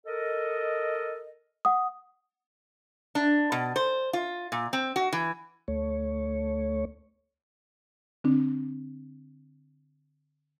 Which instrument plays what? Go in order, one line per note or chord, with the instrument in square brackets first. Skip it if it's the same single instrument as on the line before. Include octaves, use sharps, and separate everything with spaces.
[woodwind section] A4 A#4 D#5
[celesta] F#5 D#6
[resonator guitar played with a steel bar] D4
B2
C5
F4
A#2
C4
F#4
E3
[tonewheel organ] D2 A3 C#5
[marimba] D3 C4 D4